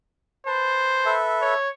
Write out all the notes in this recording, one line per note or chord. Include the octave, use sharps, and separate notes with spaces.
B4 C5 A5
A4 B4 E5
C#5